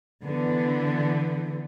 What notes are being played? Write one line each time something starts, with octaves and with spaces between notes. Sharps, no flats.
D3 E3 B3